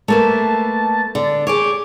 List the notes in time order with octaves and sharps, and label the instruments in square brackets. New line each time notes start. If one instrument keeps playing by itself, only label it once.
[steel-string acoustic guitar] A3 A#3 B4 [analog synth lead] A5
[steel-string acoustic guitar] D3
[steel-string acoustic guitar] G4 G#4 C#5 [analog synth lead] D6